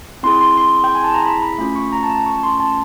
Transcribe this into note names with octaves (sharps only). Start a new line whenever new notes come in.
C4 E4 G#4 C6
C6
C6
G5
G#5
A5
A#5
B5
B5
A3 C#4 F4 B5
C#6
A#5
A5
A5
C#6
C6
A5